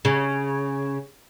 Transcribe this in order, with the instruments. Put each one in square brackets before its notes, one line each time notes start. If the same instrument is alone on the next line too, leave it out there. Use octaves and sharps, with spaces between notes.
[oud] C#3